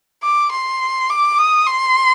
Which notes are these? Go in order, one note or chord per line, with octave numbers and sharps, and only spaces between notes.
D6
C6
D6
D#6
C6